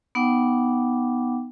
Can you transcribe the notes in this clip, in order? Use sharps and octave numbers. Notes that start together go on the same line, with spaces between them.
B3 D#4 F#5 G5 D6